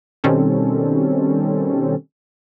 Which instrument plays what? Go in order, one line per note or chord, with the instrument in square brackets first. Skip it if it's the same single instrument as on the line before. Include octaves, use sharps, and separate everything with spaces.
[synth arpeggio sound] B2 D#3 G3 C4 C#4 A4